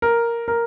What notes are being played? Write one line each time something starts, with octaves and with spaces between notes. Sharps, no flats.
A#4
A#4